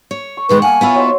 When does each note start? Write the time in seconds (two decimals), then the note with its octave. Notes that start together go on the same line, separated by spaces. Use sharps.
0.11 C#5
0.37 C#6
0.49 B2 D#3 G#3 B4
0.62 A#3 F#5 G#5 A5
0.81 B3 E4 F4 C#5 E5 B5
0.95 F#3 D#4 C5